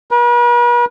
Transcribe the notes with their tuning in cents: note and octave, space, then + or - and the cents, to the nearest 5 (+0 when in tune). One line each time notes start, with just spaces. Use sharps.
B4 -45